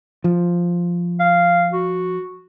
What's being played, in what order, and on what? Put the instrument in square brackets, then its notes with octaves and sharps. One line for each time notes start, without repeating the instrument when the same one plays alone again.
[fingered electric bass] F3
[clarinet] F5
F#4